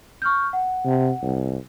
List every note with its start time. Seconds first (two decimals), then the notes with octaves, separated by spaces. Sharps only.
0.22 C#6 F6 G6
0.53 F#5
0.85 C3
1.22 C2